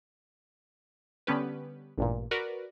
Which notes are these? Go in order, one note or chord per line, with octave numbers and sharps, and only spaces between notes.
D3 G3 B3 C#4 G4 B4
A1 G2 A#2
F#4 A#4 B4 D5